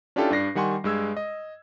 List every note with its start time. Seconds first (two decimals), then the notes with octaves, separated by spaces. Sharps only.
0.16 C#4 D4 E4 F4 G4 A4
0.31 G2 D4 A#6 C7
0.55 D#3 G3 F#5 G#5 C6 C#6
0.84 G2 G#3 E6 G#6
1.17 D#5